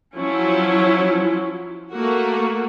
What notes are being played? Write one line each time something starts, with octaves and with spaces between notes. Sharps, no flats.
F3 F#3 C#4 E4
A3 A#3 F#4